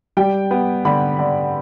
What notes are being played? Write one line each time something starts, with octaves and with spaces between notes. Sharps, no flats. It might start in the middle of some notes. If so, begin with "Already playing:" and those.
G3 G5
B3
D3 B5
D3